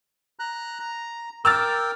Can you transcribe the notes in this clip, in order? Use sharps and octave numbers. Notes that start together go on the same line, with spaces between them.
A#5 F#6
A#5
A#4 G5 D6 E6 F6 A6